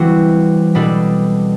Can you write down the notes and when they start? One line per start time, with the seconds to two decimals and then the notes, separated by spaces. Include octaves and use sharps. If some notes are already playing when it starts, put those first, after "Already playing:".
Already playing: E3 G3 C4 F#4
0.75 B2 G3 D4 A4